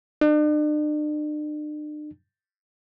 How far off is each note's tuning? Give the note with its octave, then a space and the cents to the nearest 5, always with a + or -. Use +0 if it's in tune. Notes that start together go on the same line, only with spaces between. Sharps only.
D4 +40